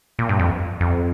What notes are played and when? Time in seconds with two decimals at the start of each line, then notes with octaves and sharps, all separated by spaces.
0.19 A#2
0.29 G2
0.39 F2
0.80 F2